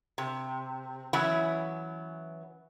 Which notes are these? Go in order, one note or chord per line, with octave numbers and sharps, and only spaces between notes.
C3
E3 F#3 B3 C#4 E4